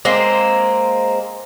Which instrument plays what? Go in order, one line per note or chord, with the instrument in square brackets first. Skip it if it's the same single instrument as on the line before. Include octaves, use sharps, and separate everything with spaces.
[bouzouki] G#3 A#3 C4